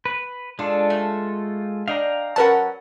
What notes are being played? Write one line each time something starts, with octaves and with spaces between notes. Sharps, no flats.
B4
G#3 D4 F4 A4
A3
D4 D#5 F5 G5 A#5
F#3 C#4 A#4 B4 F#5 A5